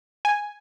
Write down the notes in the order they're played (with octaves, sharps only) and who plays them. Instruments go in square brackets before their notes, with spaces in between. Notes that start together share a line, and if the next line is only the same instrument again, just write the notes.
[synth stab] G#5